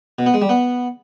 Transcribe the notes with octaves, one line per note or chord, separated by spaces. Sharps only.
B2
B3
G#3
G3
B3